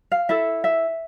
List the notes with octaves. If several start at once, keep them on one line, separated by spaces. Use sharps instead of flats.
F5
E4 A4 E5
E5